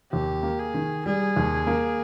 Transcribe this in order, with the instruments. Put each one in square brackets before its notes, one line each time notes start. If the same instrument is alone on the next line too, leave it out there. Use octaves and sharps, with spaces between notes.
[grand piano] D#2 [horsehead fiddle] G4
[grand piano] A#3
[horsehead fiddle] G#4
[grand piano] D#3
[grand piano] G3 [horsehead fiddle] G#4
[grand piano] D#2
A#3